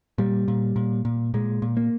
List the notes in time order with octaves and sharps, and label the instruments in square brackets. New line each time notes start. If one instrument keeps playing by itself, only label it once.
[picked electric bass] A#2 G3
A#2
A#2
A#2
A#2 G#3
A#2
A#3